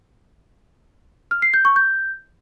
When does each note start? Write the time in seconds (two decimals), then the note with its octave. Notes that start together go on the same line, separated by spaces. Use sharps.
1.31 F6
1.42 C7
1.54 G6
1.65 C#6
1.76 G6